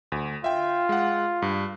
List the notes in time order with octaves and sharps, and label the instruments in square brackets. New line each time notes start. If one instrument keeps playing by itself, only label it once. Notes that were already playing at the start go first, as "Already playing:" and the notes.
[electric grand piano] D2
[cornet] F4 [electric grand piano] E5 G5
[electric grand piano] G#3 F#5
G2